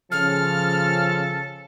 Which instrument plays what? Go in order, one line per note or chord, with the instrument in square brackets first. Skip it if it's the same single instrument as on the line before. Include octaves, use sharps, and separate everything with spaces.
[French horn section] C#3 F3 [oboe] A4 [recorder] F6